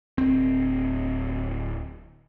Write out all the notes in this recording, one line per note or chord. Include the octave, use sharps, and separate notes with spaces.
D1 C4